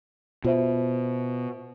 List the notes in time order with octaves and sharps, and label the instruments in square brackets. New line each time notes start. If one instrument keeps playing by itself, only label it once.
[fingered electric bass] B2 [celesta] F4 C5 E5